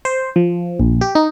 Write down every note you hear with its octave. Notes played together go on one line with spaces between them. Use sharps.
C5
F3
A#1
G4
D#4